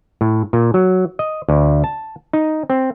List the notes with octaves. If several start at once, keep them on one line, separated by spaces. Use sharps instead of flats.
A2
A#2
F#3
D#5
D2
A5
D#4
C4